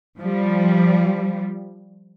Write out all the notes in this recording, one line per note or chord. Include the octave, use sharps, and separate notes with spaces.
F3 G3